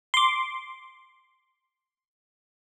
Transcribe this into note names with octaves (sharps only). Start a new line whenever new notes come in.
C6 D6